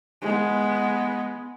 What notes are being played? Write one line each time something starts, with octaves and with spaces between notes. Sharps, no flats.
G#3 B3